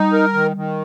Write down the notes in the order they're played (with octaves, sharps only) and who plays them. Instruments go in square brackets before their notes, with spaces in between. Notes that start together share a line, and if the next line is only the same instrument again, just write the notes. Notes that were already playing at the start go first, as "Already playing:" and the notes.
Already playing: [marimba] G3 [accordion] D#4
[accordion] A#4
D#3
D#3